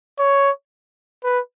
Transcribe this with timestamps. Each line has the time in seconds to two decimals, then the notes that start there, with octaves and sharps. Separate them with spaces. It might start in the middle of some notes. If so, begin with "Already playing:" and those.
0.19 C#5
1.24 B4